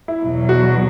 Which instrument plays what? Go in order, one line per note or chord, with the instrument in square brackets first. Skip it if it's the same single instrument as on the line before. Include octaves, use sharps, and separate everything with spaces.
[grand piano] E4
[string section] E2 B2 F#3
[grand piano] F#4